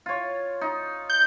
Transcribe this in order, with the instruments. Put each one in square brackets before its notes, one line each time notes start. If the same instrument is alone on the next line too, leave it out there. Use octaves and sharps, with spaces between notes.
[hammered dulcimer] F4 C#5
D#4
[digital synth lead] G6